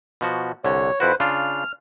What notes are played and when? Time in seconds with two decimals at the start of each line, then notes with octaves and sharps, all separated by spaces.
0.21 B2 F3 F#4
0.64 C2 D3 C#5
1.00 F2 E4 F#4 B4 C5
1.20 C#3 D4 F4 F6